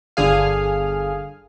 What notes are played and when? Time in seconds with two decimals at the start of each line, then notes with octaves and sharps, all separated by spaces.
0.17 G1 D3 G#4 F5